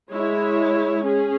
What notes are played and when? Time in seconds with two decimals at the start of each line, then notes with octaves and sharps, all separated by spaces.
0.11 G#3 E4 C#5
1.06 C#4 G#4